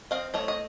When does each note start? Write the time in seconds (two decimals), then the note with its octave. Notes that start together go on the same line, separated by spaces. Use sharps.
0.11 C4 D#5 F5
0.34 A3 C#5 D#5
0.48 D#5